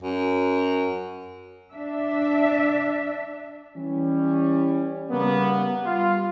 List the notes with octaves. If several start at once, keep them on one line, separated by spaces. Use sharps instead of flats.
F#2
D4 E5
E3 G3 C#4
C#3 G3 A#3 B3
G3 F4 F5